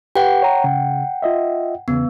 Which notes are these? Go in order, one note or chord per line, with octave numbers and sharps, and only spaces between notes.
G4 B4 F#5 G5
C#5 A#5
C#3
F4 D#5 E5
E2 C#3 B3